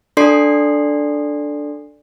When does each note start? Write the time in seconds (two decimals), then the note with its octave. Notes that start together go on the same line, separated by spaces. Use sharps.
0.17 D4 A4 D5 C6 C7